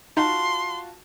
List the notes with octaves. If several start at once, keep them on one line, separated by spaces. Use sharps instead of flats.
D#4 F4 F#4 A5 C6